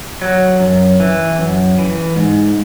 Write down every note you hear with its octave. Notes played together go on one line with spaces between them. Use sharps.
F#3
F#2
E3
F#2
E3
G#2